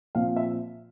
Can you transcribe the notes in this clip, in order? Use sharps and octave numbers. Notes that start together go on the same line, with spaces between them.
A#2 F3 C4 F5
E5